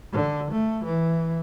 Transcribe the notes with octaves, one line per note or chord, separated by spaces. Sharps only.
D3
A3
E3